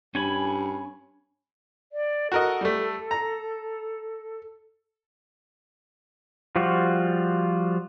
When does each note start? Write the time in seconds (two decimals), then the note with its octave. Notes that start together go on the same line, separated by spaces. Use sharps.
0.15 G2 C#4 G#5 B5
1.92 D5
2.32 F#4 A4 A#4 D#5
2.61 G3 A3
3.11 A#5
6.56 F3 G3 F4 F#4